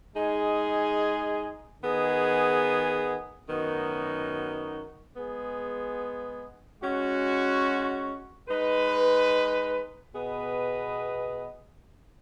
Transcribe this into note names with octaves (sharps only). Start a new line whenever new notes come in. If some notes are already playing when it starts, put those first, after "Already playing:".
G#3 D#4 G#4
D#3 B3 G#4 D#5
F#2 D#3 B3 D#4 F#4
G#3 B3 G#4
G#3 C#4 F#4
G#3 D#4 B4
B2 B3 G#4 B4 D#5